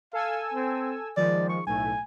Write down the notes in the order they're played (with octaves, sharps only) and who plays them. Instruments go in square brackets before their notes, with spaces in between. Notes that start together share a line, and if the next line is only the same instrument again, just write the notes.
[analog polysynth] A4 G#5 E6 [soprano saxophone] F5
[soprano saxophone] C4
[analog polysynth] D#3 F3 G#3 [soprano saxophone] D5
[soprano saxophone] C#6
[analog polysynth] B1 A2 A3 [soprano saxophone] G#5